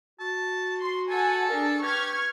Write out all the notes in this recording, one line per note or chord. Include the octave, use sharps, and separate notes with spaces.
F#4 A5
C6
A4 F#5 G#5 A5
D4 G#4 A#4
G4 B4 C#6 F6 G#6